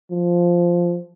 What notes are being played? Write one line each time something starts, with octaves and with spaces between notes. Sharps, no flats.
F3